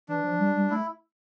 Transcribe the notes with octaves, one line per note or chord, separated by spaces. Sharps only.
E3 D4
F3
G3
G3
A3 E4